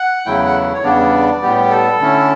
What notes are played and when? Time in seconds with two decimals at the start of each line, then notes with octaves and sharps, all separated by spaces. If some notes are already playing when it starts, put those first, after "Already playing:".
Already playing: F#5
0.26 E2 C#3 F#3 A3 E4 G5
0.46 F#5
0.74 C#5
0.83 E2 C#3 G3 B3 D4 D5
1.42 A2 G3 B3 G4
1.70 A4
2.00 D3 A3 C#4 E4